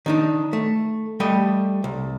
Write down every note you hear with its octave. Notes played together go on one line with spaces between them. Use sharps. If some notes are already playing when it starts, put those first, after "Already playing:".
D#3 D4 D#4
A3
G3 A3 G4 D#5
C2